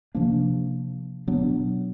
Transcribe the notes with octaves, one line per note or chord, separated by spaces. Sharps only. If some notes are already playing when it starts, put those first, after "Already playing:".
C3 F3 A#3 D4
B2 F#3 B3 D4